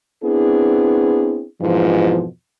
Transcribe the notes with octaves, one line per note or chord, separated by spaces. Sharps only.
B3 C4 D4 E4 G#4
F2 G#2 B2 E3 F3